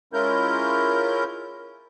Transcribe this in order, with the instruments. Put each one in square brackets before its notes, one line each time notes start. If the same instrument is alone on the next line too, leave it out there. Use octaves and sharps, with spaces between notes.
[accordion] G#3 C#4 E4 F4 A#4 G6